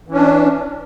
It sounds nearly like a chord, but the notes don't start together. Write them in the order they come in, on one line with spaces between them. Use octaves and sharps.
E3 C#4 D4